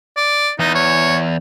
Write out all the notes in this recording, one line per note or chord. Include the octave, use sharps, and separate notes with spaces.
D5
E2 D#4
C#5